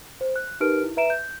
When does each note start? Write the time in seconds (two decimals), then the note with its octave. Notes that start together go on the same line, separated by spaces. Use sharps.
0.21 C5
0.36 F#6
0.60 D#4 G4 A#4 B4 F6 D7
0.84 E4
0.97 B4 E5 A#5 D7 E7
1.10 G6